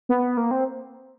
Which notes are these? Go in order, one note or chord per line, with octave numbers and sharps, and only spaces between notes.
B3
A#3
C4